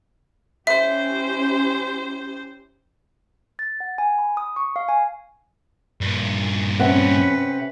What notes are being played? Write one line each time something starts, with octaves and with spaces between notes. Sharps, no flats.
C#4 E4 G4 C5 E5
A6
F#5
G#5
B5
D#6
C#6
F5
G#5
G2 A#2
C3 C4 C#4 B4 F#5